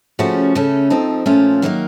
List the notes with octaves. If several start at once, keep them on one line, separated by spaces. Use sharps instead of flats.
C#3 F3 A3 C#4 F#4
C#3 A3 C#4 A4
F3 C4 D#4 A4
A#2 F3 A3 C#4 F4
D#3 F#3 A#3 D#4 A#4